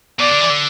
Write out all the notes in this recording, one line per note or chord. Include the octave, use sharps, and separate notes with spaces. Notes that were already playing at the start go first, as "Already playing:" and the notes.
B2 D5
D3
E3
D3